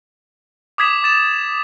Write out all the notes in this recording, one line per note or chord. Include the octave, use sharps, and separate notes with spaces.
D6 D#6 G#6 B6 E7
D6 A6 E7